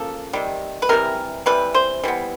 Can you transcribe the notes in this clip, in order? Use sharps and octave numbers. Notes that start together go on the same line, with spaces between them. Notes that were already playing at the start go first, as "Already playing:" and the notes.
Already playing: C#3 F3 A#3 A4
C3 D#3 G3
B4
C3 E3 G3 A#4
C3 E3 G3 B4
C5
E3 G3 B3